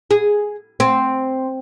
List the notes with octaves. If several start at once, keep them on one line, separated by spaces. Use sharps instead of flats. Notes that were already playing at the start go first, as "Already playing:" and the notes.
G#4
C4